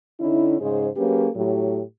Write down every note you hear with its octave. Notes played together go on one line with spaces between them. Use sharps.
D3 C#4 D#4 E4
G#2 C#3 G#3 G#4 C5
F#3 A#3 C#4 G4 G#4 B4
A2 F#3 G4